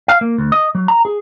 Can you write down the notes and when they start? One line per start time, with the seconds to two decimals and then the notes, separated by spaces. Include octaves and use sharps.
0.08 F5
0.21 A#3
0.38 D2
0.52 D#5
0.75 F#3
0.88 A#5
1.05 G#4